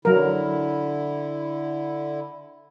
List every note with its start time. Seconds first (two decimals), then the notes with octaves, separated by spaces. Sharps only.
0.05 D3 F#3 E4 A#4